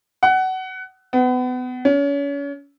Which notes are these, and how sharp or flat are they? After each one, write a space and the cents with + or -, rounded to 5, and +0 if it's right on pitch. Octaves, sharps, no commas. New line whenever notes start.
F#5 +20
B3 +30
C#4 +35